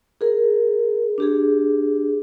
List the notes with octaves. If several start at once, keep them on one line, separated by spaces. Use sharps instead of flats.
G#4 A#4
D4 G4 G#4